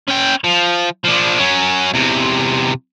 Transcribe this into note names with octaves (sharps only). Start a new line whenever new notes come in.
C#4 G5
F3
F3 D4
F#3 C#4
E2 C3